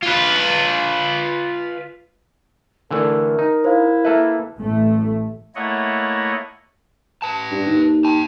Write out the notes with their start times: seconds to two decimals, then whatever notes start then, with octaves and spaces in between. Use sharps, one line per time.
0.02 F4 B4
2.91 D3 E3 A3 A#4
3.39 D#4
3.64 E4 C5 F5
4.05 A#3 A4 B4 E5
4.58 A1 A2 A3
5.55 A3 A#3 E4 C#5 D#5 F#5
7.22 B4 A5
7.51 G2
7.67 D#2
8.05 G5 A5